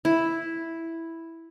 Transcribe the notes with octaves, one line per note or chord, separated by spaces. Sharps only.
E4